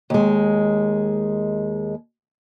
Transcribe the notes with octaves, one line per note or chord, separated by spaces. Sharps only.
D#2 G#3